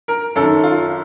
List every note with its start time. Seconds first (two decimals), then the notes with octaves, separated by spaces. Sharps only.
0.08 A#4
0.36 F#2 D#3 A4
0.63 F4